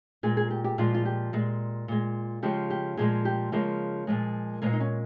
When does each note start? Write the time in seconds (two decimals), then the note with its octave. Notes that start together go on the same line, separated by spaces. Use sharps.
0.23 A#2 G#3 G#4
0.37 G#4
0.50 G4
0.64 G4
0.78 A#2 F3 G#3 F4
0.94 F4
1.05 G4
1.33 A#2 G#3
1.88 A#2 G#3
2.42 C#3 F3 G#3 G4
2.70 G4
2.97 A#2 F3 G#3 G#4
3.25 G4
3.52 C#3 F3 G#3 A#3
4.07 A#2 F3 G#3
4.62 A#2 F3 G#3 A#3
4.73 D#4
4.80 C#4